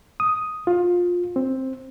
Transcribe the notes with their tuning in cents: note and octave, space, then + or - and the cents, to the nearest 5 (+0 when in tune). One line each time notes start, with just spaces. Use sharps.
D#6 +0
F4 +20
C4 +10